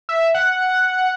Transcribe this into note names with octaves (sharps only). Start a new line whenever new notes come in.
E5
F#5